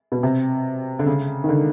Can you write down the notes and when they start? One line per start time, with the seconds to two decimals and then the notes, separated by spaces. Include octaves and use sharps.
0.12 B2
0.23 C3
0.99 D3
1.06 C#3
1.44 D#3
1.49 D3